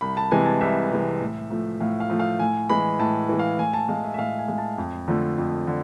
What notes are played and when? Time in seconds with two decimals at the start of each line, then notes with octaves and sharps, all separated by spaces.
0.01 C2 B5
0.17 A5
0.31 C3 E3 G#3 G#5
0.46 A5
0.61 C2 E5
0.91 C3 E3 G#3
1.21 A2
1.51 F3 A3
1.80 A2 F5
2.00 F5
2.10 F3 A3
2.20 F5
2.39 A2 G#5
2.70 E3 G#3 B5
2.99 A2 A5
3.29 E3 G#3
3.39 F5
3.59 A2 G#5
3.74 A5
3.89 G#3 F5
4.04 E5
4.14 E5
4.18 A2 F5
4.39 G#5
4.48 G#3
4.58 A5
4.78 F2
5.08 D3 F3 A3
5.38 F2
5.67 D3